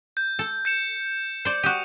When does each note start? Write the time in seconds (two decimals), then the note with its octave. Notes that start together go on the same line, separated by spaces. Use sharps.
0.17 G6
0.39 A4
0.65 G6 C#7 E7
1.45 C5 D5
1.63 F#4 G4 D#6 D#7